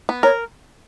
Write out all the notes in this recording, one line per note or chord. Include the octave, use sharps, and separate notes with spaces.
B3
A#4 C#5